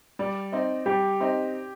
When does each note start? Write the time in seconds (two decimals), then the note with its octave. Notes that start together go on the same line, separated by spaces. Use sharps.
0.19 G3 D5
0.52 C4 D#4
0.86 G3 G4
1.20 C4 D#4